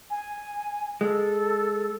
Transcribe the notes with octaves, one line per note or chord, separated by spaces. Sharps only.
G#5
G#3 A4